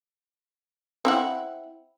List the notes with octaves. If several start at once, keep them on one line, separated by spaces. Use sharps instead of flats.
C4 E4 F#5